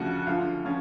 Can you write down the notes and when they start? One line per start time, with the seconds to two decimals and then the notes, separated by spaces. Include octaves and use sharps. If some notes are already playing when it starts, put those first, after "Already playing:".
Already playing: D2 C#3 F3 F#4
0.27 D2 D3 F3 F4
0.65 F3 C#4